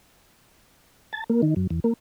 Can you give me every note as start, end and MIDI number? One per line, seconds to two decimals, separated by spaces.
1.13 1.24 81
1.30 1.41 58
1.42 1.54 51
1.56 1.67 42
1.70 1.80 40
1.84 1.93 58